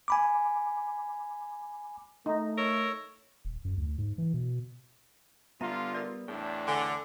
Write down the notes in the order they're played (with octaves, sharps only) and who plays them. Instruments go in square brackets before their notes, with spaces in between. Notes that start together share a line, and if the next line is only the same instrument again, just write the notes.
[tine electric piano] G#5 B5 D6
[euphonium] A3 [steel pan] D#4
[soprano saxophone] A#4 [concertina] C#5 E6
[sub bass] D#1
F#2
D2
G#2
E3
B2
[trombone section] D3 F4 [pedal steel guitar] G3 B3 [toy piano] E5 A#5
[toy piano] A#4 D5 E5
[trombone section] E2 A2 D4 [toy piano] G#4 [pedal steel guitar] G5
[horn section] D3 [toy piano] F5 G#5